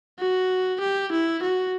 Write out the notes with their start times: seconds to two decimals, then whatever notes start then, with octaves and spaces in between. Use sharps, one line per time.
0.20 F#4
0.80 G4
1.12 E4
1.42 F#4